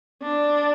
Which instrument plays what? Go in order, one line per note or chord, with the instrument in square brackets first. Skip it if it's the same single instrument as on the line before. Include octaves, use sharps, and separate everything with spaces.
[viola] D4